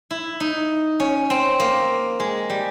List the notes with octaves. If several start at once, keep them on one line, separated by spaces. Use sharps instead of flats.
E4
D#4
C#4
C4
A#3
G#3
G3